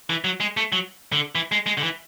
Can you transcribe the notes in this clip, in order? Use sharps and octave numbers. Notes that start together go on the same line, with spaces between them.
E3
F#3
G#3
A3
F#3
D3
E3
G#3
G#3
D3
E3